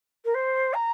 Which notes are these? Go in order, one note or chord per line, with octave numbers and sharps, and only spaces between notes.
A#4
C5
A#5